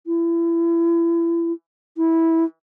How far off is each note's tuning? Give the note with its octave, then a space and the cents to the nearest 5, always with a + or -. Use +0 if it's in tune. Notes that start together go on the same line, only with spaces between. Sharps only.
E4 +30
E4 -15